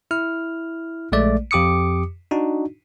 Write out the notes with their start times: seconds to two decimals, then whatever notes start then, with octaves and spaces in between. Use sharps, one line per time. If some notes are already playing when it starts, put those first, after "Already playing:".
0.11 E4 F6
1.12 A#1 G#3 A3 D5
1.51 F2 G4 D6 D#6 C#7
2.31 D4 D#4 F#4